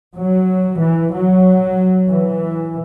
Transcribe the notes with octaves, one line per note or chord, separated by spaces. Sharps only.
F#3
E3
F#3
E3